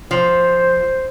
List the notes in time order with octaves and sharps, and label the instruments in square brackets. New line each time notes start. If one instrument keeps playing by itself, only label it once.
[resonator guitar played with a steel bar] F3 [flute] C5